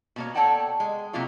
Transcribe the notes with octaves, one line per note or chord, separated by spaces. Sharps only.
B2 A#3 C#5
A4 C#5 D5 F#5 G5 A5
G#3
C3 F#3 A#3 F4 C#5